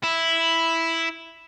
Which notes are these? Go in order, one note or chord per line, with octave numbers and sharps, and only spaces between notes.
E4